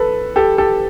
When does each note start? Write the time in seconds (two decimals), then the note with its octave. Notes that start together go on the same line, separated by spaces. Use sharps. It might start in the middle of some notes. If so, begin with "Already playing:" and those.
Already playing: A4 B4
0.36 G4 A4
0.58 G4 A4